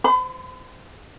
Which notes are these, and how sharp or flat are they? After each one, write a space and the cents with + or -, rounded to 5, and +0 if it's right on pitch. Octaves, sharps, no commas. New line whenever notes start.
C5 -25 B5 +40